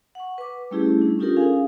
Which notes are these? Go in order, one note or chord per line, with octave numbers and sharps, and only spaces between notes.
F#5 C#6
B4 D6
G3 A3 C#4 E4 G4 G#4
G3 D4
C#4 D#4 F4 G4 A4 A#4
C#4 D#4 G#4 F5 G#5